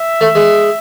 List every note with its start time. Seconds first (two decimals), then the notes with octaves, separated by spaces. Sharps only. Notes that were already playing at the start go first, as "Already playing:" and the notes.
Already playing: E5
0.21 A3
0.35 G#3